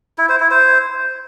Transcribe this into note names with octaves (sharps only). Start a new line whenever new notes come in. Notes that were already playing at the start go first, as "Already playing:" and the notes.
E4
C5
E4
C5